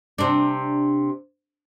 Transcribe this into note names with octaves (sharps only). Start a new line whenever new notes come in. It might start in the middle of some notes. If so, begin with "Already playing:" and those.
C3 D4